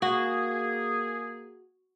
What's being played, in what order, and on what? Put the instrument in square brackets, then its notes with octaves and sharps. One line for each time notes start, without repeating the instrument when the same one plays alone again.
[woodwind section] A#3 G#4 [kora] F#4